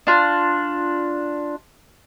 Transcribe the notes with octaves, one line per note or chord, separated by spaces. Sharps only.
D4 F4